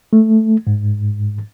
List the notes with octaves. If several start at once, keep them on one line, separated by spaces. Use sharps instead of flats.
A3
G#2